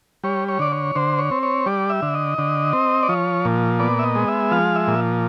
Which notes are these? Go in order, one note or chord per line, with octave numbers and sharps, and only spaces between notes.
G3 C#5
C#5
D3 D5
C#5
D3 C5
C#5
C4
C#5
G3 D5
E5
D3
D#5
D3
C4
D5
F3 C#5
A#2
B3 D5
E5
D#5
G#3
E5
F3 F5
E5
A#2